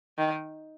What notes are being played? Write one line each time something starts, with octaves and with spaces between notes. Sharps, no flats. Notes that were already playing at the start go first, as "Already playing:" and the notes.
D#3